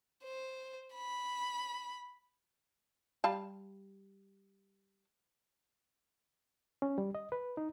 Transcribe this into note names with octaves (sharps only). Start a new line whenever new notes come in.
C5
B5
G3 F5 A5
C#4
G3
D#5
B4
D#4